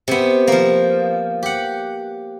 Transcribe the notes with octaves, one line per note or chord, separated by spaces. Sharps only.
C3 B3
F3 A#3
G4 F#5